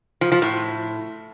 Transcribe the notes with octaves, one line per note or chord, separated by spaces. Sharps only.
F3
F3
A2